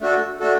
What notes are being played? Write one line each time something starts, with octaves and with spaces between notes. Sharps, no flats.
A3 D4 F#4 A4
A3 D4 F#4 A4